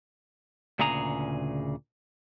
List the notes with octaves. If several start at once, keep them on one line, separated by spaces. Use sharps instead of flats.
D2 A#2 C#3 G#4 A#5